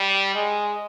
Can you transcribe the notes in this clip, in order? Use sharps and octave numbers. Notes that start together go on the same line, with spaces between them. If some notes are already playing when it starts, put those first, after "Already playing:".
Already playing: G3
G#3